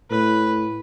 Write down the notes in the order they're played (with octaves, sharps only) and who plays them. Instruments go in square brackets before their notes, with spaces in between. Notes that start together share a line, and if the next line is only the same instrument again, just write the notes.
[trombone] A2 [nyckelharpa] B4